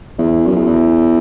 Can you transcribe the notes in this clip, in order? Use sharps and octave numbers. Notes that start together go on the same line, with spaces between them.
E2
F#2
E2
E2